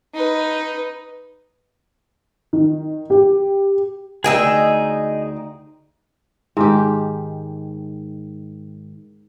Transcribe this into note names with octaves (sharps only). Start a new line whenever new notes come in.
D#4 B4
D#3
G4
D2 D#4 G#4 D#5 G5 E6
G#2 D#3 G4